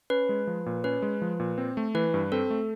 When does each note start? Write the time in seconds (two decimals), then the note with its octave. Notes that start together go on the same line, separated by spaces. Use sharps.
0.10 C#4 B4
0.29 G#3
0.47 F3
0.66 A#2
0.84 C#4 B4
1.02 G#3
1.22 F3
1.40 A#2
1.58 C4
1.77 A3
1.95 E3 B4
2.14 G2
2.32 C4 A4
2.50 A3